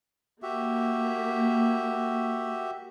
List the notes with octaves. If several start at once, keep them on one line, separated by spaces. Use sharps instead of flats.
A#3 F#4 G4 E5